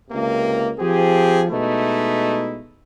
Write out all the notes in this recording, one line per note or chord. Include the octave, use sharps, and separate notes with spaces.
C#2 C3 A#3
F3 C4 G4 G#4
B2 G#3 A3 D#4 E4